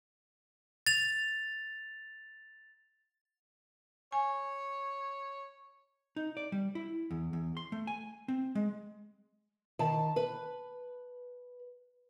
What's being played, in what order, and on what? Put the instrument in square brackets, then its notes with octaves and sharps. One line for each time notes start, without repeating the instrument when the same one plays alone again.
[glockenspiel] A6 F7
[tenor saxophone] C#5 [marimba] G#5
[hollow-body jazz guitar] D#4
D5
G3
E4
E2
E2
C6
A3
G#5
C4
G#3
[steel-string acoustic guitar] D#3 A5
B4